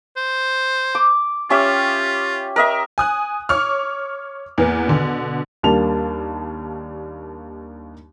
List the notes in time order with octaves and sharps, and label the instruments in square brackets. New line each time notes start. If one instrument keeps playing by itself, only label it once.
[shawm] C5
[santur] D6
[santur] C#4 G4 E5 [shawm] F4
[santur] A#4 D#5 E5
[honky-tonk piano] G#5 D#6 F#6
C#5 C#6 D6 F6
E2 A#3 B3
B2 D3
[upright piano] D#2 G3 A#3 D4 A5 F7